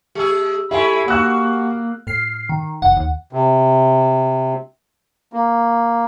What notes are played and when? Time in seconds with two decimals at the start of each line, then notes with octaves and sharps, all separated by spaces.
0.15 G#3 G4 G#4 E6
0.71 G#3 A3 E4 G4 E5 G#5 B5
1.08 A#3 F#4 E6 F#6
2.07 A2 F6 C7
2.49 D#3
2.82 F1 F#5
2.97 D#2
3.33 C3
5.33 A#3